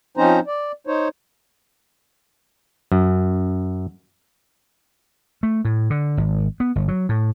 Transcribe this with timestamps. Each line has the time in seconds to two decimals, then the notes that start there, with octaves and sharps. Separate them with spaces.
0.17 F3 C4 C#4 D#4 C5 A#5
0.47 D5
0.87 D#4 C5 C#5
2.92 F#2
5.43 A3
5.65 A2
5.90 D3
6.17 G#1
6.60 B3
6.75 G1
6.88 F#3
7.09 A2